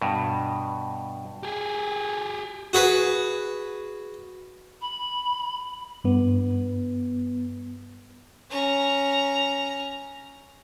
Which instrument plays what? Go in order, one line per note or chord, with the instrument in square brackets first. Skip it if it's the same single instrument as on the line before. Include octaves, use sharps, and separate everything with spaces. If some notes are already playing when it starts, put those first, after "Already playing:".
[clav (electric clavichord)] G2 B2
[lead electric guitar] G4 G#4
[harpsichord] F#4 G#4 B4
[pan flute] B5
[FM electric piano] G2 B3
[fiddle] C#4 A#5